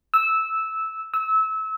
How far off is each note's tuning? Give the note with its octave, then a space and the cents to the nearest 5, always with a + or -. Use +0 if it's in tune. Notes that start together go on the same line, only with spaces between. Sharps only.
E6 -10
E6 -25